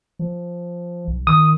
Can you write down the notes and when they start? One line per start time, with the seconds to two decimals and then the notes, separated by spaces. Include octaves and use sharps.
0.19 F3
1.08 B1
1.27 D#3 D#6